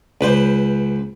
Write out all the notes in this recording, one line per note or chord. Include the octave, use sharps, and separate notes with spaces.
C#2 B4 C5